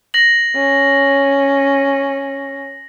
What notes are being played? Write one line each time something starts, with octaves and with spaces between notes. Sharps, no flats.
A#6 F#7
C#4